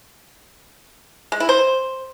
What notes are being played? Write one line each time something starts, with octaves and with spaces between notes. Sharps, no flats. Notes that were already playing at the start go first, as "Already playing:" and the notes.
G#3
E4
C5